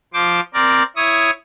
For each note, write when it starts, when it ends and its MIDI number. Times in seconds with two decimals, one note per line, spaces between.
0.14 0.40 53
0.14 0.40 72
0.14 0.40 86
0.54 0.83 60
0.54 0.83 70
0.54 0.83 74
0.96 1.31 64
0.96 1.31 73
0.96 1.31 87